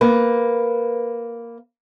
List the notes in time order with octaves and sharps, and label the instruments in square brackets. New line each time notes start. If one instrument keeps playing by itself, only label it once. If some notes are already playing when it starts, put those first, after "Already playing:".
[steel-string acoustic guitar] A#3 B4